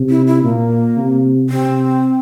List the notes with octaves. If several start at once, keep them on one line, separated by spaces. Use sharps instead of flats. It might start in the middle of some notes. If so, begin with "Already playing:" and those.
Already playing: C3
E4
E4
A#2 A#3
C3
C3 C4